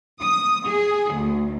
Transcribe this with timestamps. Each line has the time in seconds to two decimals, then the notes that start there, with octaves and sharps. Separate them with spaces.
0.21 D#6
0.66 G#4
1.13 D2